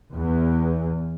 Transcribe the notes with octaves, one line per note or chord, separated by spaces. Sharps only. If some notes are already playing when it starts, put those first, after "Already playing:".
E2